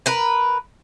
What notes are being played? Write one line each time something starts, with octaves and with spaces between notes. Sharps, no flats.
A#4 B4